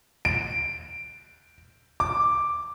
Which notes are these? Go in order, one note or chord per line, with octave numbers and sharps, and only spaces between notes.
D7
D6